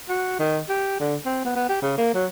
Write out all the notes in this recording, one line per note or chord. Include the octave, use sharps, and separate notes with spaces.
F#4
D#3
G4
D3
C4
B3
B3
G4
C#3
A#3
F#3